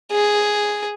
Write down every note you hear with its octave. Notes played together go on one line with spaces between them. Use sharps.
G#4